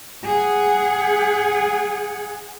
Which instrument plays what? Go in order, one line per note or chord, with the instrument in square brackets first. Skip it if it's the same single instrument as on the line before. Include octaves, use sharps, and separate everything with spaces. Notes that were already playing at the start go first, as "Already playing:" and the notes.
[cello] G#4 F#5